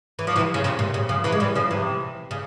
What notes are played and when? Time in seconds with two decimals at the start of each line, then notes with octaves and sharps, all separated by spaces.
0.19 E3
0.27 F3
0.36 C3 E3
0.54 C#3
0.64 C3
0.79 A#2
0.94 C#3
1.09 C#3 F3
1.24 C3 E3
1.32 G#3
1.40 E3 G3
1.55 C#3 F3
1.71 C3 E3
2.31 C#3